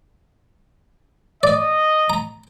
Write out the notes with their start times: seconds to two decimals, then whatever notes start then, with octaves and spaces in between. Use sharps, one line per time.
1.43 D5 D#5
2.10 A#5